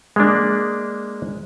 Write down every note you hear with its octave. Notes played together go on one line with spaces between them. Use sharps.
G#3 A#3 D4